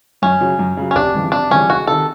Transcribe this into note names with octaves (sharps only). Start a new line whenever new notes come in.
F#2 C#4
C#3 F#3
F#2
C#3 F#3
C#4
F1 D4
F2 C#3 E3 G3
F1 D4
F2 C#3 E3 G3 C#4
C#2 F#4
C3 D#3 A4